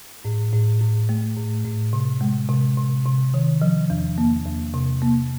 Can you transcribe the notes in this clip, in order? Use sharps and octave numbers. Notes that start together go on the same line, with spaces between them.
A2
A2
A2
A3
A2
A2
C3
G#3
C3
C3
C3
D#3
F3
E2
A#3
E2
C3
A#3